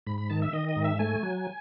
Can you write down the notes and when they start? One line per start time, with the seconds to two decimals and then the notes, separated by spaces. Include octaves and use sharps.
0.07 G#2 B5
0.18 B5
0.30 D#3 A5
0.42 E5
0.53 D#3 D#5
0.69 D#5
0.76 G#2
0.84 E5
0.99 A3 G#5
1.23 F#3